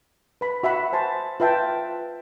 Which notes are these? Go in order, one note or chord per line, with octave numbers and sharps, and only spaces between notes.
B4 B5
F#4 E5 F#5 B5
C5 G#5 A5 C6
F4 B4 E5 G5 A5